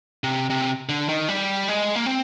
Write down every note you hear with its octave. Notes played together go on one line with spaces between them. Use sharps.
C3
C3
D3
D#3
G3
G#3
A#3
C4